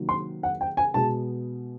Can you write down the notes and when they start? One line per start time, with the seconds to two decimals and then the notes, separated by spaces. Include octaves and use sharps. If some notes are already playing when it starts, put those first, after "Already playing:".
Already playing: C3 D#3 F#3 A#3
0.09 C6
0.43 F#5
0.61 G5
0.77 G#5
0.94 B2 G#3 B3 A5